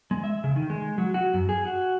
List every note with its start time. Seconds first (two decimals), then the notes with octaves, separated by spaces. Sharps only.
0.11 G#3
0.24 E5
0.44 C#3
0.56 D#3
0.70 G#3
0.98 F#3
1.14 F#4
1.34 F#2
1.49 G#4
1.65 F#4